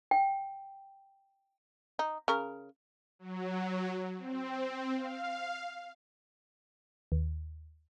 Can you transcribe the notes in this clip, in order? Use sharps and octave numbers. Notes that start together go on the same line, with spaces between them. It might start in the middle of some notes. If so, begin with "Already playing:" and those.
G5
D#4
C#3 A#4
F#3
C4
F5
D#2